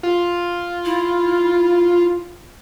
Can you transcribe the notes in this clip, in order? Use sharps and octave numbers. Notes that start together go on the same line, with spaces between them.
F4
E4